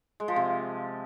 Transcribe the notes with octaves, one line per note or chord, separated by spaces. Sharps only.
G#3
F3
C3